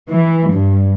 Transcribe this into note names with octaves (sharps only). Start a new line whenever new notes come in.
E3
G2